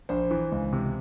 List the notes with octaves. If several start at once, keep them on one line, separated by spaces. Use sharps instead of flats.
A#1 C5
E3
C#2
C3